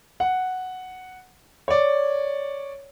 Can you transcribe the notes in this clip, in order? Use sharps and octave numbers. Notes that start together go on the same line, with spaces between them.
F#5
C#5 D5